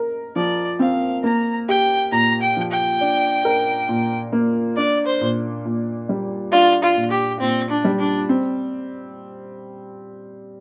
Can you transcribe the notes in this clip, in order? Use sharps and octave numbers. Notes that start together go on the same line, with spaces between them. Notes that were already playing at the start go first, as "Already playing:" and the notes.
Already playing: A#4
F3 D5
C4 F5
A#3 A#5
G4 G5
A#2 A#5
G5
F3
G5
D4
A#4
A#2
A#3
D4 D5
C5
A#2
A#2
G3
D4 F4
F4
A#2
G4
A#2 C4
D4
G3
D4
C4